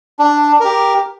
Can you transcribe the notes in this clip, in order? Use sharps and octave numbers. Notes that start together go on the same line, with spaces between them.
D4
G4 A#4